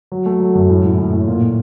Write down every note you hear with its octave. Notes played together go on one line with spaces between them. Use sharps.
F#3
A3
F#3
F#2
A2
A2
A2
A2
A#2
A#2